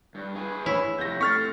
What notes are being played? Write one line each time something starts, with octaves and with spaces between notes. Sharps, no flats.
G2
G#4 B4
E4 C#5
F2 C3 G6 A#6
A3 C4 C#6 F6 A6 B6